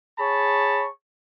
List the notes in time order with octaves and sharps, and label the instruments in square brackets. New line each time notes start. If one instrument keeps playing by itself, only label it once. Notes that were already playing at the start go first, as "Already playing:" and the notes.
[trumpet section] G#4 C#5 A5 B5 C#6